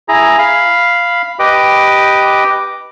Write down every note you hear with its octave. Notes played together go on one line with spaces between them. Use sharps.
E4 G#4 A#5
F5 B5
G4 B4 D#5 D6